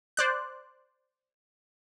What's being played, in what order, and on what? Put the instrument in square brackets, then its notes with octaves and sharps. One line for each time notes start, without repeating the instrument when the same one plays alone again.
[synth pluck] C5 D5 F#6